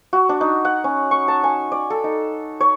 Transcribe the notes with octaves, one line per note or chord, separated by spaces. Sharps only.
F#4
D4
D#4
F#5
C#4
C#6
A5
G#5
D5
A4
D#4
C#5